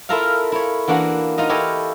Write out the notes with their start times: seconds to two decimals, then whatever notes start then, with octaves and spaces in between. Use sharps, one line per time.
0.09 E4 F4 A4 A#4 E5 F5
0.52 E4 C#5
0.88 E3 A#3 D4 F#4 F#5
1.38 D#4 F4 D#5
1.49 E4 G4 A4 C#5 D#5 F5